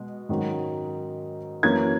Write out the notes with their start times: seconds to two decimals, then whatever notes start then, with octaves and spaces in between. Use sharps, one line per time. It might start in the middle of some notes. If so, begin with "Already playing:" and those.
Already playing: B2 G#3
0.29 G#2 D#3 F#3 C#4
1.63 F#2 E3 A#3 C#4 G#6